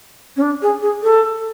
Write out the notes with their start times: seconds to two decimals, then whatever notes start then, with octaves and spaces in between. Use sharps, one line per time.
0.36 C#4
0.42 D4
0.62 G#4
0.82 G#4
1.03 A4